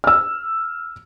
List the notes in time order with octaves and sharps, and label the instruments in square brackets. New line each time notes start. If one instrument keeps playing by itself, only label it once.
[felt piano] E6 F6